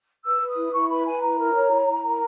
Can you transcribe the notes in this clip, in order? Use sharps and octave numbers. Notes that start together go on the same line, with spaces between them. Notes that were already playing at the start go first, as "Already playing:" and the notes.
B4 E6
B4
D#6
E4
E4 C#6
B4 B5
B4 G#5
E4 A#5
A#4
C#5
E4
E4
A#4